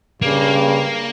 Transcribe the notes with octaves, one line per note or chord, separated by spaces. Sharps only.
G2 C#3 A#3